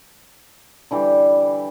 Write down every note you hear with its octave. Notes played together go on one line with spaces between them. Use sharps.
D3 E3 G3 G4